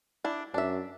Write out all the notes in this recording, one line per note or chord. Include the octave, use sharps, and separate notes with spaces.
D4 E4
F#2 D4 E5